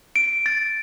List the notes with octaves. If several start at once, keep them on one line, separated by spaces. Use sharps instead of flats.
D7
A6